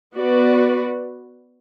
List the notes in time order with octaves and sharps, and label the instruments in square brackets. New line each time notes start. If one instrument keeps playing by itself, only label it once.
[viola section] B3 F#4 B4 D5